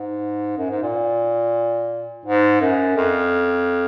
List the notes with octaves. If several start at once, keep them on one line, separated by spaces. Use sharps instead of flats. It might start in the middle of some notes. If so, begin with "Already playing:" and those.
Already playing: G#2
F#2
G#2
A#2
G#2
F#2
F2